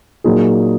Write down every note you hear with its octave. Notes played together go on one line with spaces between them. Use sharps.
A#2 F#3 A#3 D#4 G#4